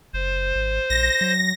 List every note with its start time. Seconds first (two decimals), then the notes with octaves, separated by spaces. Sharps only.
0.13 F#1 C5
0.55 G#1
0.90 A#1 A#6
1.21 F#3